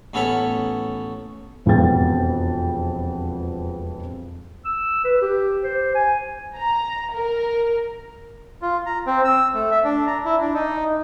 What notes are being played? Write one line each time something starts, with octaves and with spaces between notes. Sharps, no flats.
A1 B3 C#4 A4 C#5 B5
E1 F2 B3 G#4 G5 A6
E6
B4
G4
C5
G#5
A#5
A#4
F4
A#5
C4
E6
A3
E5
D4
A#5
E4
D4
D#4